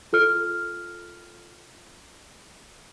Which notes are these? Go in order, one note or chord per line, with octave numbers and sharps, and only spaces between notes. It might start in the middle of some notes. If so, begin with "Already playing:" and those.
F4 A4 F6